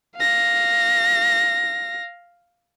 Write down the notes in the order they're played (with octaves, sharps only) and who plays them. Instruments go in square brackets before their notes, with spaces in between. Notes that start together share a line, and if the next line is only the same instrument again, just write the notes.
[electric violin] F5 A#6